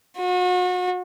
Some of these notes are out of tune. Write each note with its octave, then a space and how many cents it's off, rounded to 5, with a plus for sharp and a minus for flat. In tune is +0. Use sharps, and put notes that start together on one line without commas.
F#4 -35